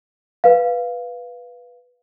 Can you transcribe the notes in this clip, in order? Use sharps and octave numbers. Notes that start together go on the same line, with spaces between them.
B4 F5